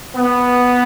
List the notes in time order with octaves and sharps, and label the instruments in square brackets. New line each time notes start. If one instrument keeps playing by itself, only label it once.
[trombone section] B3